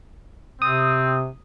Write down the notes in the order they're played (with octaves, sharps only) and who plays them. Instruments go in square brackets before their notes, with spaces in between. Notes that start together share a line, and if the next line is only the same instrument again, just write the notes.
[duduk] C3 [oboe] C4 [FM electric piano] D#6